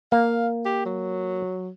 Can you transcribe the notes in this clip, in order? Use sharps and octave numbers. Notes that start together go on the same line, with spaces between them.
A#3 F5
G4
F#3